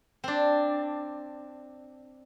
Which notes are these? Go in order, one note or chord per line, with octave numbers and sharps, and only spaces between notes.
C4 D4